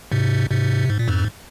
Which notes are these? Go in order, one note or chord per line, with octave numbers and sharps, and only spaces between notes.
G#2 C3
G#2 C3
G#2
A#2
F2 G#2